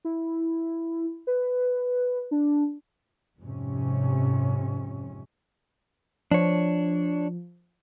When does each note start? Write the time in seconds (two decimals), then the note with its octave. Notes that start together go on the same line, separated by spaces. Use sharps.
0.05 E4
1.27 B4
2.31 D4
3.40 F2 G#2 C3 C#4
6.31 F3 D4 C#5